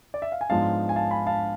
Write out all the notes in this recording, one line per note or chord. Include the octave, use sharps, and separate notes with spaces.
D5
E5
F5
G#5
G#2 F3 G#3 B3 D4 F5 A5
G#5
F5 A5
G#5 B5
F5 A5